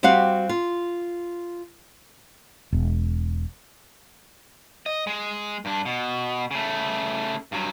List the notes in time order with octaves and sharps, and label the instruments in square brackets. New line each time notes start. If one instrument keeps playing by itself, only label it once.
[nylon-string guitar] G3 C4 F#4 G4 F5 F#5
F4
[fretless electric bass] E1
[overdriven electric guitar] D#5
G#3
G2 D4
B2
C#3 A3
G2 F#3